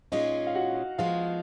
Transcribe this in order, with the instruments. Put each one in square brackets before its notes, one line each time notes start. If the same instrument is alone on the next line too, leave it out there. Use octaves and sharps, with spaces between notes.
[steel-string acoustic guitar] A#2 G#3 C#4 F4 [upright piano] D#4 D#5
[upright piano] F5
F#4 F#5
[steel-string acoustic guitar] F3 G#3 B3 [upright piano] F4 F5